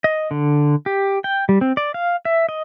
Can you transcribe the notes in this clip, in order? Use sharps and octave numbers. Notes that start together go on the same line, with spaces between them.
D#5
D3
G4
G5
G3
C4
D5
F5
E5
D#5